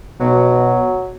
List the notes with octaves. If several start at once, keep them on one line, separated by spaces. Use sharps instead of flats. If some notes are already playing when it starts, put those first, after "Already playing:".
B2 F#3